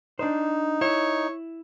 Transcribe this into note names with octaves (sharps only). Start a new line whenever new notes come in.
D4 D#4 C5
E4 C#5